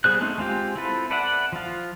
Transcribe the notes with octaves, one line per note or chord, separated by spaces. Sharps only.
G3 B3 G#4 C5 F#6
A3 C4 C#4 D#4
G#3 C4 F4 G4
C4 E4 F4 A4 B4
A4 B4 D5 E5 F#5
F3 F4